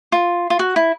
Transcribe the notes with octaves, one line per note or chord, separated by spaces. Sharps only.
F4
F4
F#4
E4